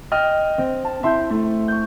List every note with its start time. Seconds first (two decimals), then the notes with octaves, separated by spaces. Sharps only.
0.12 D#5 G5 F6
0.58 C4
0.85 A5
1.03 C4 E4 E5 C6 G6
1.31 A3
1.68 C#6 G6